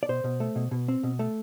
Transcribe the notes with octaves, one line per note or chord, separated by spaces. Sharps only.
D5
B2 C5
B2
A3
B2
B2
C4
B2
A3